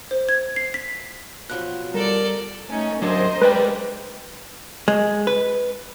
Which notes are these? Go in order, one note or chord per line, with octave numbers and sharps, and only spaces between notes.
C5
G#6
C7
B6
B2 F3 F#3 F#6
G3 A4 A#4 D5
A3 C#4 D#4
F#3 D4 A#4 C5 D#5
G#3 B4 D5 G5
G#3
B4